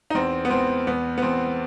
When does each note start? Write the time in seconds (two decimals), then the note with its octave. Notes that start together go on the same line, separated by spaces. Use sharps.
0.10 D#4
0.14 E2 C4
0.45 B3
0.50 E2 C4
0.87 E2 B3
1.18 B3
1.22 E2 C4